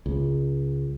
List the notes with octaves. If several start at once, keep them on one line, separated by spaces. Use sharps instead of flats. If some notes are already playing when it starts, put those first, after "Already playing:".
C#2